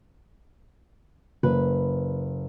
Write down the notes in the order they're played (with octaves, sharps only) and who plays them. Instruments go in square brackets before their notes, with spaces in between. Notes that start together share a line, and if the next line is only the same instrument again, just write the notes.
[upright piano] F#1 [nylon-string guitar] B4